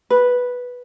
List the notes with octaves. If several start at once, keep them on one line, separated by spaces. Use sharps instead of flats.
B4